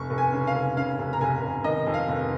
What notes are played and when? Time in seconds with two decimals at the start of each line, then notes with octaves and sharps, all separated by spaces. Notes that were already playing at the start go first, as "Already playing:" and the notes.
Already playing: F1 C#6
0.10 F1
0.18 G#5
0.32 C#3
0.47 F5
0.55 F1
0.77 C#3 F5
0.99 F1
1.13 A#5
1.21 F1 G#5
1.42 F1
1.64 D#3 D#5
1.86 F2
1.94 F5
2.08 F1